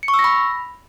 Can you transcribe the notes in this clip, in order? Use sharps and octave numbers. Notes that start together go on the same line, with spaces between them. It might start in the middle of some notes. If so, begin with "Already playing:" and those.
C#7
C#6
E6
A#6
B5